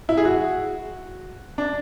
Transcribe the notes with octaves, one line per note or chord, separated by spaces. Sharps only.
E4
G#4
F#4
D4